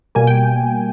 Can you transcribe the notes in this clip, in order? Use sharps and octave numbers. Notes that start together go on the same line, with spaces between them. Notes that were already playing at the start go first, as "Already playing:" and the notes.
B2 G3 A#3 G#5
G5